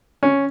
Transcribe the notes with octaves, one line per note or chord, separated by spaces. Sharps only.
C#4